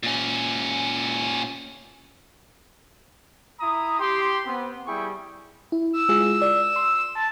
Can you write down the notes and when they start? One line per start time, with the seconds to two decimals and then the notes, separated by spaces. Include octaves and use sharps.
0.03 A#2 C#4
3.60 E4 A#5 D#6
4.00 G4 C6
4.46 B3 C4
4.87 G3 E4 G#4 G5 C#6
5.72 E4
5.93 E6
6.09 G#3 F4 G#4
6.42 D5
6.76 C6
7.15 A5